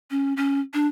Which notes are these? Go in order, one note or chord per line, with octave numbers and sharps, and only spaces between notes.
C#4
C#4
D4